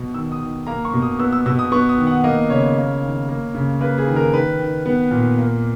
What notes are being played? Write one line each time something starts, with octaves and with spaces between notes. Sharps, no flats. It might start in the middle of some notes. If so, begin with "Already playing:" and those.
Already playing: B2
D#3 E6
D#6
D#3
A#3 A#5
C#6
B2
D#6
B3 E6
E6
B2 E6
D#6
B3 C#6
D#6
D#3
F#5
A#3 D#5
C#3 C#5
A#3
D#3
A#3
C#3
A#3 B4
G#4
D#3
A#4
D#3 B4
D#3
B3
A#2
A#3